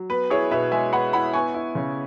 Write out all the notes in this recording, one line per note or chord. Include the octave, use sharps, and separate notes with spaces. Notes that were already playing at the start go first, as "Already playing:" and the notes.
Already playing: F#3
B3 B4
E4 G#4 C#5
B2 B4 E5
G#3 E5 G#5
B3 F#5 B5
E4 F#5 B5
B3 G#5 C#6
E4
C#3